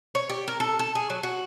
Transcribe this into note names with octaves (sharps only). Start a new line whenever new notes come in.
C#5
G4
A#4
A4
A4
G#4
F#3
F#4